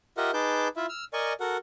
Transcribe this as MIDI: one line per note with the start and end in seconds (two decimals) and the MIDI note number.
0.17 0.31 65
0.17 0.31 67
0.17 0.31 70
0.17 0.31 75
0.17 0.31 76
0.17 0.31 78
0.34 0.68 63
0.34 0.68 68
0.34 0.68 71
0.34 0.68 81
0.34 0.68 86
0.34 0.68 91
0.76 0.86 64
0.76 0.86 65
0.76 0.86 76
0.89 1.05 88
0.89 1.05 89
1.13 1.33 70
1.13 1.33 74
1.13 1.33 75
1.13 1.33 80
1.13 1.33 85
1.40 1.57 66
1.40 1.57 69
1.40 1.57 70
1.40 1.57 78